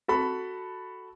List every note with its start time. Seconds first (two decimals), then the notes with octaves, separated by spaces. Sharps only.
0.08 F#4 A4 B5